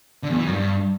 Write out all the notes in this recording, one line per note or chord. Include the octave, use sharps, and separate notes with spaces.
D3
E2
E3
F#2
G2